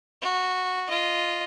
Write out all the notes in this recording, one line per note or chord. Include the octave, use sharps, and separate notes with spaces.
F#4
F4 D#5